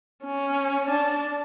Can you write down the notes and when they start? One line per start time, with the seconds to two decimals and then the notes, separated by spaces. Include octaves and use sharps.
0.24 C#4
0.89 D4